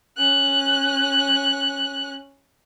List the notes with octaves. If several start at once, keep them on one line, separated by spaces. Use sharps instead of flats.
C#4 F#6